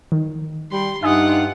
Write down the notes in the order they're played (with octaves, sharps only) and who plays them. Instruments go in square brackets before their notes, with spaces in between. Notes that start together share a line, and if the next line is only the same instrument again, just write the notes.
[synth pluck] D#3
[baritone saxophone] G3 [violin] C6
[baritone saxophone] G2 [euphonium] D#4 [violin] F4 F#5 [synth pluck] E5 G#5 D#6